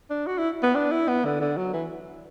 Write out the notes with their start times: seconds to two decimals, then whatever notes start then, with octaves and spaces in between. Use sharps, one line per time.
0.10 D4
0.27 F#4
0.38 E4
0.63 B3
0.75 D4
0.91 E4
1.08 B3
1.25 D3
1.41 D3
1.57 F#3
1.73 E3